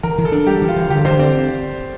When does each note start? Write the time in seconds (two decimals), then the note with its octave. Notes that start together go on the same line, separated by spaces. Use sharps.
0.03 E3 A#4
0.18 E3
0.25 A4
0.32 D4
0.47 G3 G4
0.61 E3
0.68 F4
0.76 E3
0.90 D3 G4
1.04 D3 C5
1.19 C4 D5